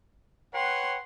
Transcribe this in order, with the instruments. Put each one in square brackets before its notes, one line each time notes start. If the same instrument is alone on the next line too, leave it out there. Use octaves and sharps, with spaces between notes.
[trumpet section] B4 C#5 F#5 [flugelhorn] G5 [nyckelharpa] C6